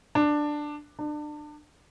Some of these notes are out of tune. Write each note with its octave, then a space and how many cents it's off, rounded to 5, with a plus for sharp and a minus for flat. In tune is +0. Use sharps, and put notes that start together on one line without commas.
D4 +10
D4 +30